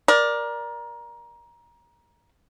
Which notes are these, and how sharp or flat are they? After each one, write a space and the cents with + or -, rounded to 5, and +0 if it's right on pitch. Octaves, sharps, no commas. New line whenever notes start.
A#4 +20 D5 +0